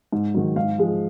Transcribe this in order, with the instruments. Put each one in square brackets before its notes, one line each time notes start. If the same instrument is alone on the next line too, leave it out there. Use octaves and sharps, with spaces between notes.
[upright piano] G#2
D#3 F#3
G#2 F5
F3 G#3